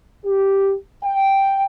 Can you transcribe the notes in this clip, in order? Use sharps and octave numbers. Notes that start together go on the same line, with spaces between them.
G4
G5